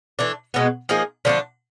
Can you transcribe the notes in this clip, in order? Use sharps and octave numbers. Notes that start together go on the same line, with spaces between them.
E3 A3 D4
B2 G#3 B3
F3 A#3 D#4 G#4
D3 F3 A3 D4